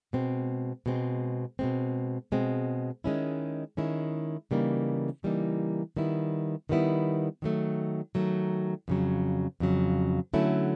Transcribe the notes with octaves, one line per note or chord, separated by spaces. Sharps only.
B2 G#3 C4
B2 G#3 C4
B2 G#3 C4
B2 G#3 C4
D#3 G#3 C#4 E4
D#3 G#3 C#4 E4
C#3 E3 G3 A#3 D#4
C#3 E3 G3 A#3 D#4
D#3 G3 B3 E4
D#3 G3 B3 E4
D#3 F#3 A3
D#3 F#3 A3
F2 C#3 F#3
F2 C#3 F#3
D3 F#3 A3 C#4 E4